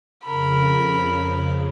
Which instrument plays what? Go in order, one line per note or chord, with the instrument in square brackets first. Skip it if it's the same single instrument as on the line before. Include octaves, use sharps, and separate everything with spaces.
[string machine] F2 C#3 [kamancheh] A#4 B5